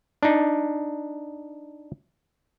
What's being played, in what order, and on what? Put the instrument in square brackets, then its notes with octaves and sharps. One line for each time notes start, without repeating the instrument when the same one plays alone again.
[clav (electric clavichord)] D4 D#4